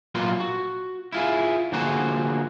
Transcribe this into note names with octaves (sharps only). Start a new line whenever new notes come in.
A#2 F#3 A#3 B3 F4 C6
F#4
E4 F4 G#4
D3 F3 A#3 F#4 G#4 C5